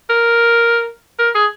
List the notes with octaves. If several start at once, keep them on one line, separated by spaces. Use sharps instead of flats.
A#4
A#4
G#4